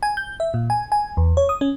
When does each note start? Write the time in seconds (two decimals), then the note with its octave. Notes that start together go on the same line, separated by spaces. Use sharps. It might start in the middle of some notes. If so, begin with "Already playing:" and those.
0.03 G#5
0.17 G6
0.40 E5
0.54 A#2
0.70 G#5
0.92 G#5
1.17 E2
1.37 C#5
1.49 D#6
1.61 C#4